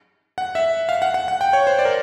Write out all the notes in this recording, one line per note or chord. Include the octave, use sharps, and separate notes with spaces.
F#5
E5
F5
F#5
F#5
F#5
G5
C#5
C5
D5
A#4